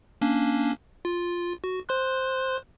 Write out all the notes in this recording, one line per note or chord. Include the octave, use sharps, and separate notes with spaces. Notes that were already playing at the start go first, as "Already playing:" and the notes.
A#3 C#4 D4
F4
F#4
C5 C6 F#6